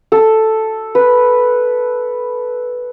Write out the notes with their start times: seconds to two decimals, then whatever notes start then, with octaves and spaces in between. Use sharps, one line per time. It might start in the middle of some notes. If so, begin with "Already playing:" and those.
0.12 A4
0.95 B4